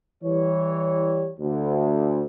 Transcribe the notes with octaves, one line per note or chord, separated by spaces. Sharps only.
E3 G3 C#5
D2